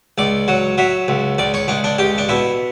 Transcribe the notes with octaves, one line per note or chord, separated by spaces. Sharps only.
C#2 D5
F#3
F#3 E5
C#2
C#2 D5
C#5
C#2 D4
D4
C#2 G4
D4
B2 E4